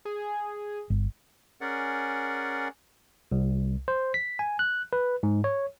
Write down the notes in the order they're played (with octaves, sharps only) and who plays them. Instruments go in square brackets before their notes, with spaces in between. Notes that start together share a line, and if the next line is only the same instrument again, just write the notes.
[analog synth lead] G#4
[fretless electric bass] G1
[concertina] C#4 G#4 A#4 D5 F#5
[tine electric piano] C2
C5
B6
G#5
F#6
B4
G#2
C#5